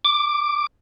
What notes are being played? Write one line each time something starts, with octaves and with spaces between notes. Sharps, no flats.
D6